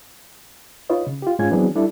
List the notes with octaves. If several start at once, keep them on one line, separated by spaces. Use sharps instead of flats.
D#4 F4 B4 C#5 D#5
C#3
F4 G4
G#2 G#3 C#4 F4 G#5 G#6
E3 F#3 B3 C4 D4 G#4
G3 D4 E4 A4